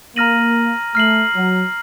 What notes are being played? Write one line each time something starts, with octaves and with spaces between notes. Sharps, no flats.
A#3 A#5 F6 A#6 D#7 F#7
A3 F6 C7 F#7
F#3